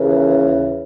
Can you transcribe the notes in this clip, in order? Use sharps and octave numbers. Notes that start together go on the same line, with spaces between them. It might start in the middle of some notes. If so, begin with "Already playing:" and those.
Already playing: D#2 C#3 E3